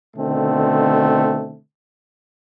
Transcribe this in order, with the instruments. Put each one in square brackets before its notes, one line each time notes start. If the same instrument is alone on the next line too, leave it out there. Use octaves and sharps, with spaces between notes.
[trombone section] B2 D3 D#3 A3 C4